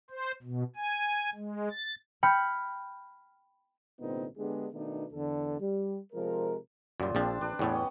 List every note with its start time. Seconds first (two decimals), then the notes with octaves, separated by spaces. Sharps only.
0.10 C5
0.42 B2
0.76 G#5
1.35 G#3
1.71 A6
2.23 G5 B5 F6 G6
4.00 C2 A#2 D3 B3 C4 D#4
4.37 D3 G#3 B3 D4 G4 G#4
4.72 B2 D#3 A3 B3 D4 D#4
5.12 E2 D3 A4
5.59 G3
6.13 C3 F3 G#3 A#4
7.00 F#2 A#2 G3 C6
7.15 A#1 F3 C4 D4 A5
7.41 A#1 D4 B4
7.59 E2 A2 A3 B3 C#4 G4
7.74 C#4 D#5